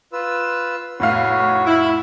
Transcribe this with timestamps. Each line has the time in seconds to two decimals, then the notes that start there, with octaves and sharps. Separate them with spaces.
0.13 F4 B4 E6
1.00 F1 A2 F#4 C#5 F5
1.66 E4